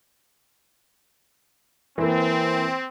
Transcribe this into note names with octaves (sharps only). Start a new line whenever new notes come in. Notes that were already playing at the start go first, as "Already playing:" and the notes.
E3 A#3 C4